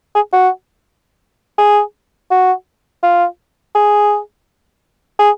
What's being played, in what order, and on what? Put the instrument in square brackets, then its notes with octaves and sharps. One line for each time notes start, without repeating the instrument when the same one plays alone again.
[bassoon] G#4
F#4
G#4
F#4
F4
G#4
G#4